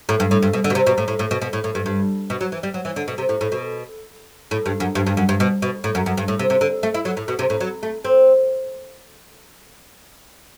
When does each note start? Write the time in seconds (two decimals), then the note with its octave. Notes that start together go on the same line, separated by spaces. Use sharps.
0.09 A2
0.20 G2
0.31 A2
0.43 G2
0.53 B2
0.64 D3
0.70 B2
0.75 C3
0.87 B2
0.98 A2
1.08 A2
1.19 A2
1.31 B2
1.42 B2
1.53 A2
1.64 A2
1.75 G2
1.86 G2
2.30 B2
2.41 F#3
2.52 E3
2.63 G3
2.74 F#3
2.85 E3
2.96 D3
3.08 B2
3.18 C3
3.29 A2
3.41 A2
3.52 B2
4.51 A2
4.66 G2
4.80 F#2
4.95 G2
5.07 G2
5.17 F#2
5.29 G2
5.40 B2
5.62 B2
5.84 A2
5.95 F#2
6.06 F#2
6.17 G2
6.28 A2
6.39 C3
6.50 C3
6.61 D3
6.83 A3
6.94 E4
7.05 F#3
7.17 A2
7.28 B2
7.39 C3
7.50 A2
7.60 F#3
7.83 A3
8.05 C4